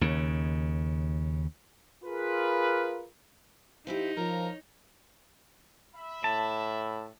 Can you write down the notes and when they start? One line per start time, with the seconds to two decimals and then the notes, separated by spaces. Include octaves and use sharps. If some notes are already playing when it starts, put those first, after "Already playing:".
0.01 D#2 C#3
2.04 F4 G#4 A#4 B4
3.87 F3 D#4 E4 G4
4.17 F3 A#4 C#5
5.95 E5 B5
6.24 A2 A5